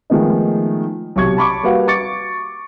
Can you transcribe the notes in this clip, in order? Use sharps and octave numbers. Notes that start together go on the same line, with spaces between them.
D#3 F3 G#3 A3 B3 D#4
B1 C3 C#6 G#6
A5 B5 C#6 D6
G3 A#3 F#4 B4 F5 F#5
C#6 D6 A6 C#7